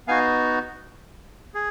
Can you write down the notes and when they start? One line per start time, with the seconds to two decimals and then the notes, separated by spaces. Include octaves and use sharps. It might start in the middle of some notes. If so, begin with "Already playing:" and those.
0.07 B3 D#4 F#4 F5 G#5
1.54 G#4